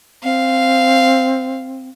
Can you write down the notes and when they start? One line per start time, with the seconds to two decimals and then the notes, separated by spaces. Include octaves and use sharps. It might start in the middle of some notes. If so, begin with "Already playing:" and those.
0.23 C4 F5